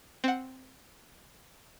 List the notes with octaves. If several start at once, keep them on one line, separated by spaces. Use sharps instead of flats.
C4 F#5